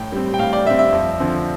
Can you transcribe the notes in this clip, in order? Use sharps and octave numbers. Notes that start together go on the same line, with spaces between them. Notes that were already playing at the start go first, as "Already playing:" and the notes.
Already playing: A2 G5
G3 C4
G5
A2 F5
D5
G3 C4 E5
E5
F2
D3 F3 C4